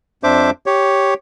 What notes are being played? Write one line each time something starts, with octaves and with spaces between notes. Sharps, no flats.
F2 D4 C5 E5 D6
G4 C#5